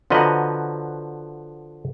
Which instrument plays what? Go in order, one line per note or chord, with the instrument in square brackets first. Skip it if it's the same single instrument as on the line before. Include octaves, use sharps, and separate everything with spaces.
[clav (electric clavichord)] D3 F3 F#4 B4 D#5 A#5